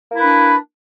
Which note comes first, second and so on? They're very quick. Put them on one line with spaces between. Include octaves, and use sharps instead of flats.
A#3 E4 B4 D4